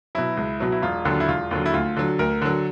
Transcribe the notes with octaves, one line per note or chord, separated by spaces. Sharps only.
B2 F#3 E4
C#2
B2 F#3
E4
E1 F4
D#2 D3 F#3
E4
E1 F4
D#2 D3 F#3
E4
D2 F4
D3 F#3
D2 A#4
D3 F#3